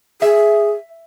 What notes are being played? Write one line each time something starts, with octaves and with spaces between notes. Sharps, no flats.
G#4 E5